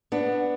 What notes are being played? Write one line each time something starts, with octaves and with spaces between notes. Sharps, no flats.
B3 D4